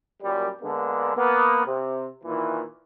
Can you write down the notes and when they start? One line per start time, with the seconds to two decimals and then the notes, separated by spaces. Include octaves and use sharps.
0.23 F#2 A#2 G3
0.62 D3 G#3 A#3 B3 D4
1.16 A#3 B3
1.66 C3
2.24 A#2 D#3 E3